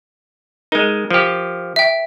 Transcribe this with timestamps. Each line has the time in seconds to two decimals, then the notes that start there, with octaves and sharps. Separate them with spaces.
0.72 G#3 D#4 A#4
1.10 F3 G4
1.76 E5 G5